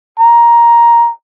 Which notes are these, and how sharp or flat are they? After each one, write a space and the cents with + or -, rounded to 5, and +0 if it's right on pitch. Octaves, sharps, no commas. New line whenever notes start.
A#5 +10